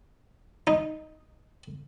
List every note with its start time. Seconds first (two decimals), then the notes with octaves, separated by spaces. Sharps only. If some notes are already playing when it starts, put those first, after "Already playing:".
0.67 D#4